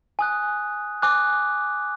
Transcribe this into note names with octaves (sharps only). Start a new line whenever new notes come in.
G#5 D#6 F#6
G#5 D6 F#6